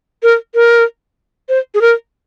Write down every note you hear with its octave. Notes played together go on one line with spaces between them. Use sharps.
A#4
A#4
C5
G#4
A#4